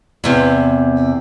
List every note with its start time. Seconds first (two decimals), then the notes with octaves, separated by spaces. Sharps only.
0.24 E2 C3